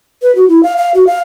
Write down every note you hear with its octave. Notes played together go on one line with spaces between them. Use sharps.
B4
F#4
E4
F5
F5
F#4
F5